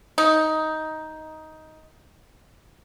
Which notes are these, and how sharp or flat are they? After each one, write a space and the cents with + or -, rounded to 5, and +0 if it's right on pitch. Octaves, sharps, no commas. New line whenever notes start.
D#4 +10